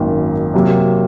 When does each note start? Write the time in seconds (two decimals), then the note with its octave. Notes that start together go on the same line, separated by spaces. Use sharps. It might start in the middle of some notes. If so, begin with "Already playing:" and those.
Already playing: G#1 F#2 D#3 A#3
0.54 C3 F#3 A#3